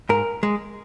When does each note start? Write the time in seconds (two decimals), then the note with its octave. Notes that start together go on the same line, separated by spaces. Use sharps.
0.09 G#2 A#4
0.43 G#3